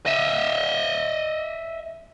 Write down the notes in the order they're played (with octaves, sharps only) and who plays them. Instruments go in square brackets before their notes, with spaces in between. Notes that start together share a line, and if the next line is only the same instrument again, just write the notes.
[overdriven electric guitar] D#5 E5